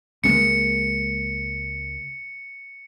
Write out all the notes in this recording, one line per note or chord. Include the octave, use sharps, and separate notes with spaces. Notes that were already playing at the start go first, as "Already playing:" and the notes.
C#2 G#3 A#3 C#7